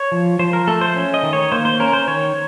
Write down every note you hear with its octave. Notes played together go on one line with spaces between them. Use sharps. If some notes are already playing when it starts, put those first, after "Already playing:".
Already playing: C#5
F3
F3 C5
A#4
A3 A4
C5
C#4
D#5
D#3
C#5
A#3 C5
C5
C#4 A#4
C5
D#3 C#5